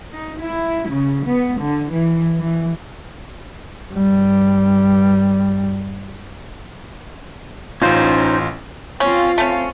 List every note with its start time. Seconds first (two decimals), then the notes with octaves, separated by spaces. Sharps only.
0.13 D#4
0.41 E4
0.89 C#3
1.27 B3
1.61 D3
1.91 E3
2.38 E3
3.91 G2 G3
7.82 A1 C#4 D#4 F4 C5
9.00 C4 C#4 F4
9.38 A3 C#4